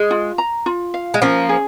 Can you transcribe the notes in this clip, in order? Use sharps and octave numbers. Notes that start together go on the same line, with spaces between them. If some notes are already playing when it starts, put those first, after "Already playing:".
Already playing: G#3
F4
A#5
F4
F5
G#3
F3 A#3 C#4
G#4